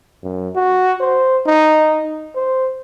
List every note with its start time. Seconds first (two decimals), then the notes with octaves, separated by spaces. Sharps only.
0.23 F#2
0.55 F#4
1.00 C5
1.47 D#4
2.36 C5